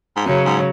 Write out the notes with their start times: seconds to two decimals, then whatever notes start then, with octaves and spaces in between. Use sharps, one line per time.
0.16 G#2
0.26 F#2 C#3 F#3
0.46 G#2